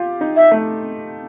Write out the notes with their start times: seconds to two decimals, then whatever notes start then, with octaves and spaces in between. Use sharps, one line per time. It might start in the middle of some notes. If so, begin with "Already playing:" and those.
Already playing: F4 G4
0.21 D#4
0.36 E5
0.51 A3